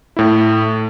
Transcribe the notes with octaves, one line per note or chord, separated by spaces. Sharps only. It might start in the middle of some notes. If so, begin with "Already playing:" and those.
A2 E4